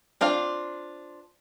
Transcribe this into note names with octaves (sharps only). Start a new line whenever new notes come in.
C4 D4 F4 F5